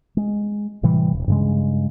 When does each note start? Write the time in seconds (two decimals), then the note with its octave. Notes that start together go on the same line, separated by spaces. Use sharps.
0.17 G#3
0.83 A2 C3 E3 G3
1.13 D#1
1.28 G2 C#3 G#3